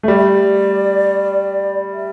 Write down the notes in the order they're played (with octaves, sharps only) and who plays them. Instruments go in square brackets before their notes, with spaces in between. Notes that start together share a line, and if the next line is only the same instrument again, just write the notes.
[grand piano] A3
[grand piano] G3 [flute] D5
[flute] E5
D5
E5